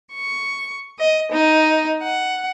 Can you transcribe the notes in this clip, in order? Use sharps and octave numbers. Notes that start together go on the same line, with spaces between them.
C#6
D#5
D#4
F#5